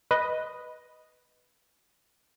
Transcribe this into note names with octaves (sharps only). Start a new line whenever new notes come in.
B4 D#5